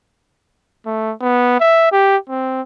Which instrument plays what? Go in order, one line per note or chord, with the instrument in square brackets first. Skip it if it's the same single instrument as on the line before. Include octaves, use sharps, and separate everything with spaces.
[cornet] A3
B3
E5
G4
C4